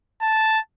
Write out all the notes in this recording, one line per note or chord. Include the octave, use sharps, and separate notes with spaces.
A5